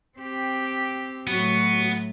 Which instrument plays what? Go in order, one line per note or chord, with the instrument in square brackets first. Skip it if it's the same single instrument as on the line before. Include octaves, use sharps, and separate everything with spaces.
[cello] C4 G4
[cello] A2 F#3 [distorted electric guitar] B3 [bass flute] F#4